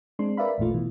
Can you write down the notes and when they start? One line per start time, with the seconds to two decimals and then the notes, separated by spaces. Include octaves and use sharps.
0.19 G#3 C4 D4 C6
0.37 A#4 B4 D5 E5 F5 B5
0.58 A1 E2 A#2 A3 F4
0.74 B2 E3